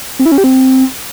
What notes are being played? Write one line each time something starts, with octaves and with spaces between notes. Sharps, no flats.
C4
E4
C#4
G4
C4